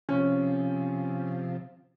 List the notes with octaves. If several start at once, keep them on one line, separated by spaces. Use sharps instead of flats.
C3 F3 C#4